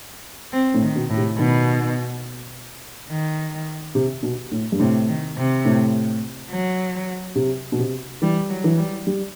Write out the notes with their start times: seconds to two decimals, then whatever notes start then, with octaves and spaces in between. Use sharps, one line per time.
0.53 C4
0.74 A2
0.81 D#3
0.95 B2
1.10 A2
1.17 C3
1.38 B2 D#3
3.09 D#3
3.95 C3
4.23 B2
4.51 A2
4.72 G2
4.80 A2 C3
5.08 D#3
5.37 C3
5.65 A2
6.50 F#3
7.36 C3
7.72 B2
7.79 C3
8.22 E3 G3
8.50 F#3
8.64 E3
8.78 G3
9.07 G3